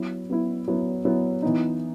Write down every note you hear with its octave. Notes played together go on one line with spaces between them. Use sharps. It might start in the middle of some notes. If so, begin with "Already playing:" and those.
Already playing: F#3 B3 E4
F#3 B3 E4
F#3 B3 E4
F#3 B3 E4
E3 B3 D#4